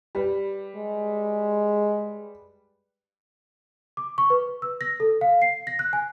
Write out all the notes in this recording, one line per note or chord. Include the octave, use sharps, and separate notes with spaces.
G3 B4
G#3
D6
C#6
B4
E6
A#6
A4
F5
C7
A#6
F#6
G#5